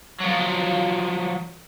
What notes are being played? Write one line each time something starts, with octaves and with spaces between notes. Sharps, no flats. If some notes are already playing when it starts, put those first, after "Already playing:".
F3 F#3